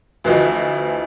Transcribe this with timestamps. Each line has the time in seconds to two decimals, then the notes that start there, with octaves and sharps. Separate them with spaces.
0.24 D2 E3 F3 F#4 D#5